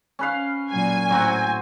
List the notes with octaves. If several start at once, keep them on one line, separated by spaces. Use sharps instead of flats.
C#4 B4 F5
A#2 F#3 G#5
A2 F#3 C4 F#4